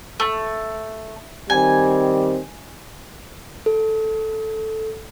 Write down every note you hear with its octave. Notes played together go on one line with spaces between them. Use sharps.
A3
D#3 G3 C4 G#5
A4